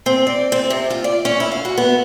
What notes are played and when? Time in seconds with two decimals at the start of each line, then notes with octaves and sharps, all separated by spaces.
0.06 C4
0.27 D5
0.52 C4
0.70 C3
0.90 F4
1.04 D5
1.25 C#4
1.40 E4
1.52 F5
1.65 F#4
1.78 B3